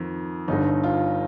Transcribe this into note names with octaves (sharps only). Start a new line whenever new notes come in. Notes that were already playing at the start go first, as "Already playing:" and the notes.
Already playing: F2 D#3
G1 G2 D3 D#4
F4